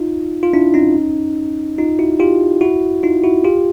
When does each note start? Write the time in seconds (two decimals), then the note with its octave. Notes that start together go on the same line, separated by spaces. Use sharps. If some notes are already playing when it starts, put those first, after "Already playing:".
Already playing: D#4 F4
0.43 F4
0.54 D4 E4
0.74 C#4 D#4
1.78 D#4 F4
1.99 E4 F#4
2.20 F4 G4
2.61 E4 F#4
3.03 D#4 F4
3.23 E4 F#4
3.44 F4 G4